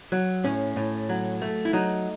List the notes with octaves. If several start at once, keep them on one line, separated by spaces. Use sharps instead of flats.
F#3
A2 C#4
A2
F#3
A3
E4
F#3 D#4